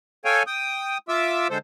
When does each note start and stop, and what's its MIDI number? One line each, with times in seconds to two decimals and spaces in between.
0.25 0.43 69
0.25 0.43 73
0.25 0.43 77
0.25 0.43 79
0.25 0.43 80
0.47 0.98 79
0.47 0.98 87
1.08 1.48 65
1.08 1.48 76
1.08 1.48 86
1.08 1.48 88
1.50 1.58 50
1.50 1.58 56
1.50 1.58 69
1.50 1.58 72